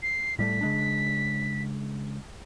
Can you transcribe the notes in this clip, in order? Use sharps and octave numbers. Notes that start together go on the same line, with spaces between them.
C7
A2 G3 A3 B6
C#3 G#3 D4